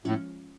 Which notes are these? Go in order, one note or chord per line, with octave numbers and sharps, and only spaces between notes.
A2 F3 G#3 C#4 F4